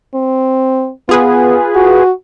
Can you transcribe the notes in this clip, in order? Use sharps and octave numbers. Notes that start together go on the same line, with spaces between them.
C4
B3 F4 G#4 B4
F#4